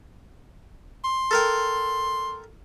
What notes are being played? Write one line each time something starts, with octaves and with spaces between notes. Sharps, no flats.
C6
A4 A#4 G5